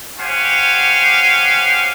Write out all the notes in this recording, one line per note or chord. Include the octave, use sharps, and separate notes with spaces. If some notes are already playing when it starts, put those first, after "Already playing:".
G4 C5 C#5 F5 F#5 G#5